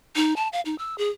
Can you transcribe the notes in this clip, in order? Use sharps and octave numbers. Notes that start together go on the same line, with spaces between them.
D#4
A5
F5
D#4
E6
G#4